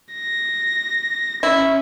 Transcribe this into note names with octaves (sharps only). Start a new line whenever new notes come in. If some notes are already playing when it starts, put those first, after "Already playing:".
A#6
C#4 E4